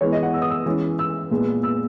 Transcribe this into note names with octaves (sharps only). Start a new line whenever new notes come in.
E3 G#3 B3 C#5
D#5
F#5
E6
D#6
E6
E3 G#3 C#4
E6
A#2 G#3 B3
E6